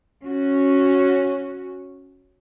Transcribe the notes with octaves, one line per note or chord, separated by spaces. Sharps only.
C#4 F#4